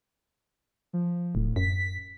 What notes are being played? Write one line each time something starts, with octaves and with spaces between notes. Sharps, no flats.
F3
D1 A2
F#2 B6